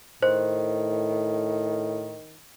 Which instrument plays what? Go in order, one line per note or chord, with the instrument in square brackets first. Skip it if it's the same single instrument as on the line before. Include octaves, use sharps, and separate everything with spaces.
[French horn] A2 [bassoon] D#3 [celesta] C5